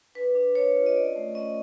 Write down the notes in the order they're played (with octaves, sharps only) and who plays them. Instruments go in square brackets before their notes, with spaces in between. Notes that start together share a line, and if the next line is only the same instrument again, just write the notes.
[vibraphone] D4 B4
D4
D4 C#5
F4
D#5
C#4 D5
A3
C#4 D#5